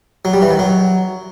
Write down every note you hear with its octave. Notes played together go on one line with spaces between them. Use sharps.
F#3
G3
E3
D#3
F#3